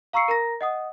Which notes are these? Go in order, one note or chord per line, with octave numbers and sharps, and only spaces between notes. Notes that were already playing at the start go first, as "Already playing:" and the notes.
F5 A#5 C#6 E6 C7 C#7
A#4 A#5 A#6
D#5 F#5 D#6